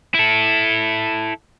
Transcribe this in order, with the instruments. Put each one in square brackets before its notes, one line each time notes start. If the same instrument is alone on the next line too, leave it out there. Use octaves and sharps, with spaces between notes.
[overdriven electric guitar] E4 A4